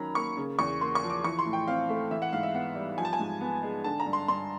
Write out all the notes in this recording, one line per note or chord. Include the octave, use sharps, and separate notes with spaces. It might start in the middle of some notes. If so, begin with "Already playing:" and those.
Already playing: D#3 F#3 C#4 A#5 B5
A#3 C#6
C#3
E2 C#6
A#3 C6
C#6
F3
D6
E3 C#6
C6
A2
G5
C4 F5
A3
E3 E5
F#5
G#2 F5
E5
B3 F#5
G3
F3 G#5
A5
G#5
G#2
B3
G#3
D3 A5
A#5
G2
C6
G2 C6